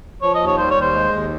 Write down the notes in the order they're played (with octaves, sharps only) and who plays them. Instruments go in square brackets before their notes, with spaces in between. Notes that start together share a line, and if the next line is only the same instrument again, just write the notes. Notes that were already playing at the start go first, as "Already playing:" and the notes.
[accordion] F3 [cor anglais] C#5
[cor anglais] D#5
[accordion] D#2
[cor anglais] C#5
[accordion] G3 [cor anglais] C5
[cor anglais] C#5
[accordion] D#2
[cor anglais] C5
[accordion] G#3
D#2